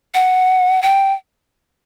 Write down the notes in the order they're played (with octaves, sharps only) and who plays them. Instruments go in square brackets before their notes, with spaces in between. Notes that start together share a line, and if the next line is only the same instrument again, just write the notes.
[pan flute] F#5
G5